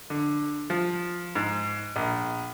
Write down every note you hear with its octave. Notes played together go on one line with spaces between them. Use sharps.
D3
F3
G#2
A#1